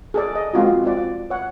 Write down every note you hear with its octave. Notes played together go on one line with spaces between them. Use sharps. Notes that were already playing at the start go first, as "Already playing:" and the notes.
G#4 A4 D5
D#5
G#3 C4 F4 F#4
C4 F4 D5
C#5 F#5